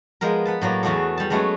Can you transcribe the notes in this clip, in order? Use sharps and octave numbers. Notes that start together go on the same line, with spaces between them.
F3 G#3 B3 A#4
B3 B4 A5
A2 F#3 A#3 D5
E2 E3 A3 F#4 G#4 A4
G3 A5
F#3 G#3 A3 B3 C#4 F#4